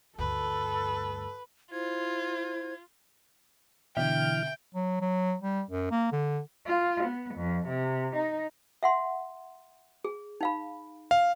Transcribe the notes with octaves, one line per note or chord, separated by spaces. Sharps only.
D2 G2 A4 B4
E4 F4 C5 G#6
B2 D3 E3 E5 G5 F6
F#3
F#3
G3
F#2
A#3
D3
F4
B3
F2
C3
D#4
E5 F#5 C6
G#4
D#4 F5 B5
F5